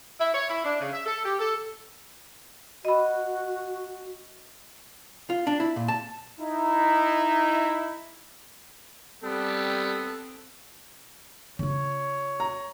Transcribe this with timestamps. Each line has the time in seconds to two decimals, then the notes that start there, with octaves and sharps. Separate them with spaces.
0.19 E4
0.34 C#5
0.49 E4
0.64 D4
0.80 C#3
0.93 E5
1.06 A4
1.24 G4
1.39 A4
2.85 F#4 D#5 B5
5.30 F4
5.47 D4
5.60 E4
5.76 A#2
5.88 A5
6.40 D#4 E4
9.24 G3 B3 C4 A4
11.59 C#3 F4 C#5
12.40 A#5